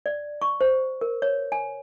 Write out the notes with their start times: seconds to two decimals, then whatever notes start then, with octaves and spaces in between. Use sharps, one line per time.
0.06 D5
0.42 C#6
0.61 C5
1.01 A#4
1.22 C#5
1.52 G#5